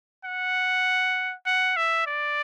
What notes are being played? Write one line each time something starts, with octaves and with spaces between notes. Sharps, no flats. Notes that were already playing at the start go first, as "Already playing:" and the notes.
F#5
F#5
E5
D5